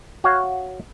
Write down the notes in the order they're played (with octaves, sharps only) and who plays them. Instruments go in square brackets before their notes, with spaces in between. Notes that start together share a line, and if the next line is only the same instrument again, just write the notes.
[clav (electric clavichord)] F#4 C#5 F5